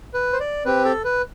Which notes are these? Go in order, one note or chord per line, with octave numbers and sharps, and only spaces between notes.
B4
C5
D5
C4 G4 B4
A4
B4